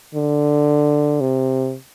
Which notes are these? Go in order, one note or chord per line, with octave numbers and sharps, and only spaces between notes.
D3
C3